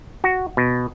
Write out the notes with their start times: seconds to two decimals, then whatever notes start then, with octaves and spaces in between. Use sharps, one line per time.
0.24 F#4
0.57 B2